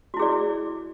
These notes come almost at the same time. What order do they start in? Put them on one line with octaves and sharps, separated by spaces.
F#4 E4 G#4 D5